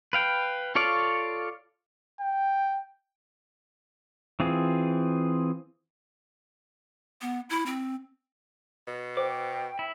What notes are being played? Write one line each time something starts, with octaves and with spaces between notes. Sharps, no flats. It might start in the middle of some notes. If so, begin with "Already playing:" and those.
B4 F5 G5
F4 A4 C#5 D5 F5
G5
E3 C4 F4 G#4
B3
E4
C4
B2
C5 G5 D6
E4